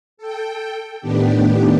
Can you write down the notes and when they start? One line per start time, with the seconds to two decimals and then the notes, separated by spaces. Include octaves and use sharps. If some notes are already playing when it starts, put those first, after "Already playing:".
0.17 A4 G5
1.01 A2 D#3 B3 D4 G4